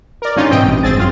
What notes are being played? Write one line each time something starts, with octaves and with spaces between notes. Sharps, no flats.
A#4 D5
G2 D3 C#4 D#4 F4
G#2 B2 E3 C4 D#5 G5
A1 G2
G#1 C4 G#4 A6
F#2 F4